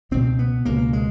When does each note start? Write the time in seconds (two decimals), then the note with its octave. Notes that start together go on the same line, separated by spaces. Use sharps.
0.11 C#2 B2 C4
0.39 B3
0.65 C#2 B2 A#3
0.93 G#3